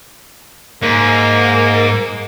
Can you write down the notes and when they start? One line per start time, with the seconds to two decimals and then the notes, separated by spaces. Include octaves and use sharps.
0.82 G#2 A#3